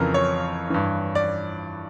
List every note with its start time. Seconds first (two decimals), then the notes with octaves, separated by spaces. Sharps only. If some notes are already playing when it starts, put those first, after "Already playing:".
Already playing: F2 C#3 E3 A#4
0.14 C#5
0.70 G2 E3
1.15 D5